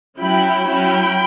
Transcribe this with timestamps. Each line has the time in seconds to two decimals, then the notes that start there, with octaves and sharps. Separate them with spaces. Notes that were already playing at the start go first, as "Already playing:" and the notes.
0.19 F#3 C#4 E4 G5 B5
0.66 F#3 C#4 E4 G5 B5